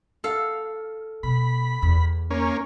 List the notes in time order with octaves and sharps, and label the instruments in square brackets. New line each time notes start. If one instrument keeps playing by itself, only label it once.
[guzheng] A4 F5
[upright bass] B2 [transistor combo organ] B5
[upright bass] E2
[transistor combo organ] A#3 C#4